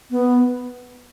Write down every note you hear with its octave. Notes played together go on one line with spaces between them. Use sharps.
B3